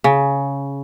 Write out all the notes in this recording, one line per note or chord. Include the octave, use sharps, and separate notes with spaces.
C#3